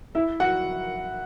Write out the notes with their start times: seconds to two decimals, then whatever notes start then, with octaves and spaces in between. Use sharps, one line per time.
0.15 E4 E5
0.40 F#4 F#5